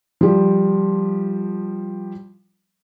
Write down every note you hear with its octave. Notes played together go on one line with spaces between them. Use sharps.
F3 G3